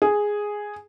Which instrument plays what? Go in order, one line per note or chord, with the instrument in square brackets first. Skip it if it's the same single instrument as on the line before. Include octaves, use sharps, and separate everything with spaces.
[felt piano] G#4